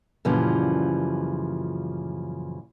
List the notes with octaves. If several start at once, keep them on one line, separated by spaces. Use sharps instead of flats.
F#2 A#2 C#3 E3 F3 G3